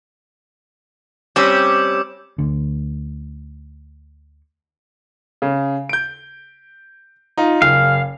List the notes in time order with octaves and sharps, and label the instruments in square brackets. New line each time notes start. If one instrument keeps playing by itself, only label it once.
[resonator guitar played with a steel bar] G3 C4 C#4 [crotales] D6 E6 G6
[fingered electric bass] D2 D3
[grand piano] C#3
G6 D7
D#4 F4
[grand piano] F#1 [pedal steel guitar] F5